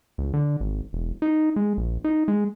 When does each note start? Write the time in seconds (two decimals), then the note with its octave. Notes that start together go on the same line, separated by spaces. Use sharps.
0.18 C#2
0.34 D3
0.60 G#1
0.93 E1
1.22 D#4
1.56 G#3
1.77 A#1
2.04 D#4
2.28 G#3